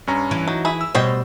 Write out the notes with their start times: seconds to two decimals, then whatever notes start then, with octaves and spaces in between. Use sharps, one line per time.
0.07 G2 C#4 A#5
0.31 E3
0.48 F#3 D#4 F#4
0.65 E4 G#4 E5
0.81 E6
0.95 B2 G3 C5 C#5 D#5 G5